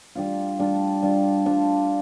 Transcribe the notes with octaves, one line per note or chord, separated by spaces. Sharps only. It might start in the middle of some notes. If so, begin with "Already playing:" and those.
G3 D4 F4
G3 D4 F4
G3 D4 F4
G3 D4 F4